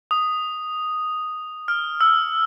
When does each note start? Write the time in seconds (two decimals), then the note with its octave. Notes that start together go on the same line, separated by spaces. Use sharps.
0.11 D#6
1.68 F6
2.01 E6